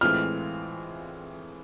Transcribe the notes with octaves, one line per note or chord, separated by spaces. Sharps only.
A2 E3 G#3 C4 F4 F6